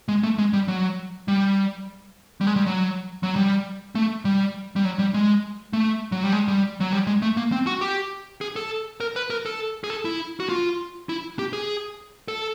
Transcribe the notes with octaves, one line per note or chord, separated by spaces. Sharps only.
G#3
A3
G#3
G3
F#3
G3
G3
G#3
G3
F#3
F#3
G3
A3
G3
G3
F#3
G3
G#3
A3
F#3
G3
G#3
G3
F#3
G3
G#3
A3
A#3
C4
F#4
G4
G#4
A4
A#4
B4
A#4
A4
G#4
A4
E4
F#4
F4
E4
G4
G#4
A4